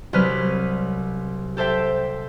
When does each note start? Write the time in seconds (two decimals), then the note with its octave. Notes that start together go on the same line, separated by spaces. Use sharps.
0.13 C2 F#3 B4 F6 D#7
1.57 G4 A4 C5 E5 G5